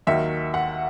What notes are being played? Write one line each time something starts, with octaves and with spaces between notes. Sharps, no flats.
D#2 D#3 F#3 E5
F#5